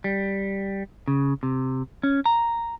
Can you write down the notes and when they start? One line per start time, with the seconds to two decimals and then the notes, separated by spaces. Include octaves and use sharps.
0.04 G3
1.08 C#3
1.43 C3
2.03 C#4
2.26 A#5